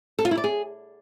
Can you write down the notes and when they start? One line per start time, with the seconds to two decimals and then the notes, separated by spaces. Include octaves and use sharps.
0.19 A4
0.25 F4
0.31 E4
0.37 D5
0.44 G#4